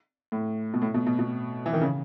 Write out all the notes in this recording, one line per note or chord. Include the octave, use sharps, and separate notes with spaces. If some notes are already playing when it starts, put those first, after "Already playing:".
A2
B2
A2
B2
B2
B2
E3
D#3
C#3